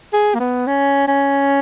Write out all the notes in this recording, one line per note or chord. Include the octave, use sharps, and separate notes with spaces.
G#4
A#3
B3
C#4
C#4